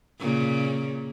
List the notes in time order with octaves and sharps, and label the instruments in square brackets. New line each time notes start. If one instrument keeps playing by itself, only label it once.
[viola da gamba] A#2 C#3